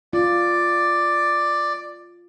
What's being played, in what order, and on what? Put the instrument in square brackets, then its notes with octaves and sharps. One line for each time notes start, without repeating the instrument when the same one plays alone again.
[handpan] F4 [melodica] D5